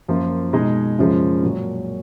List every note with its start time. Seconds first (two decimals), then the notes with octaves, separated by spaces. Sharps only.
0.08 F#2 F3 A#3 F4
0.53 B2 G#3 D#4 G#4
0.99 F#2 C#3 F3 G#3
1.43 A#2 F#3 C#4